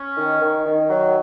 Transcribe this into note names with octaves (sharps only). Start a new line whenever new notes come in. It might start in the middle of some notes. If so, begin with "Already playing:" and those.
Already playing: C#4
D#3
D#3
D#3
F#3